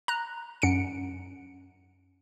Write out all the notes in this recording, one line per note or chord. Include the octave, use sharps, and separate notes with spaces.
A#5 F#6
F#2 C#7 D7